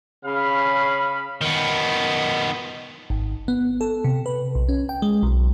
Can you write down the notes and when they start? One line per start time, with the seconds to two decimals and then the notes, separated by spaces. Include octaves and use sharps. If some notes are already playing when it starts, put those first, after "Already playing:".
0.24 C#3 F5 B5
1.41 D#3 B3
3.10 G#1
3.48 B3
3.81 A4
4.04 C3
4.26 B4
4.55 B1
4.69 C#4
4.89 G5
5.02 G#3
5.23 B1